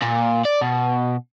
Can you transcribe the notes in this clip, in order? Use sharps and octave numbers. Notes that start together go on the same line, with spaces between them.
A#2
D5
B2